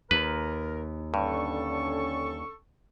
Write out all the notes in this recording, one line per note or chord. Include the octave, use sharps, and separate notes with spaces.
D#2 A#4 B4
G2 D3 C#4 A4 C#6